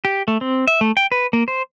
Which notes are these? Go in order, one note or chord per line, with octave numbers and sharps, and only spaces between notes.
G4
A3
C4
E5
A3
G5
B4
A#3
C5